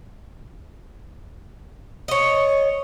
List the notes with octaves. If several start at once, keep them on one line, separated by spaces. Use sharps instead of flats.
C#5 D#5